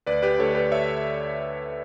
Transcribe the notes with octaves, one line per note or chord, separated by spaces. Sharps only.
D2 B4 D5
G4 B4
D3 A3 A4 C#5
G4 B4
C#5 E5